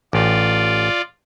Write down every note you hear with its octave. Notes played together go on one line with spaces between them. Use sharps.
A1 F4 D5